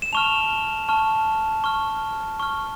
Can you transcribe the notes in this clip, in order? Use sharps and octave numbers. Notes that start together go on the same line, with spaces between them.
E7
A5 C#6 F6 F7
A5 C#6 F6
C#6 F6
C#6 F6